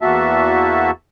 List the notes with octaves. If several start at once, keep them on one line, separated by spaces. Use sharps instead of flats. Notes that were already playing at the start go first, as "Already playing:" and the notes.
E2 A#3 F#4 E5 A5